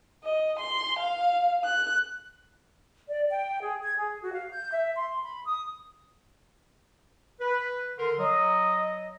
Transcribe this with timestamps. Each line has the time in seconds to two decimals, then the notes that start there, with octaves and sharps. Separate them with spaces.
0.24 D#5
0.59 C6
0.99 F5
1.64 F#6
3.08 D5
3.29 G5
3.61 G#4
3.82 G#6
3.97 G#4
4.22 F#4
4.34 F5
4.52 G6
4.73 E5
4.96 C6
5.24 B5
5.47 D#6
7.40 B4
7.98 D3 A#4 C6
8.19 F#3 D#5